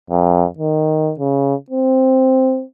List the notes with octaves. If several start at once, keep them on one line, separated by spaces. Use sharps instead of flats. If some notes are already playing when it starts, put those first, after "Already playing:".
F2
D#3
C#3
C4